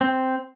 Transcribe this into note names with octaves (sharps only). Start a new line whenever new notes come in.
C4